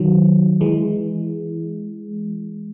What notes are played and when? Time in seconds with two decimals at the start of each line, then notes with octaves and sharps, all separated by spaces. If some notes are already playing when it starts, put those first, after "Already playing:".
Already playing: D#3 F#3
0.61 E3 G#3